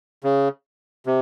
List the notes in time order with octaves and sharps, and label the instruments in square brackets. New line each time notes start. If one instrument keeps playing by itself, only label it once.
[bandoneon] C#3
C3